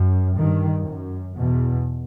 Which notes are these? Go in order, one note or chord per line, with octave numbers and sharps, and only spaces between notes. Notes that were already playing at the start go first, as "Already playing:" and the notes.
Already playing: F#2
G2 D#3
F#2
E2 B2